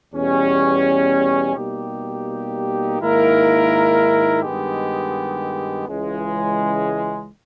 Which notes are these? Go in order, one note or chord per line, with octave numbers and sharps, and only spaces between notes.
E2 B2 G3 C#4
B2 G3 A#3 D#4 G4
G#2 D#3 A#3 E4 A#4
G2 D#3 G#3 B3 G4
C#2 C#3 E3 G#3